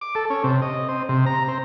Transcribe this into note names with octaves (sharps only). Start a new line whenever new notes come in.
D6
A4
C#4
C3
D#5
C4
C3
A#5
C4